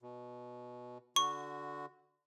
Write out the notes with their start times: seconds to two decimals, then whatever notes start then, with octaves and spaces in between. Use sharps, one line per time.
0.02 B2
1.16 D3 F#4 C#6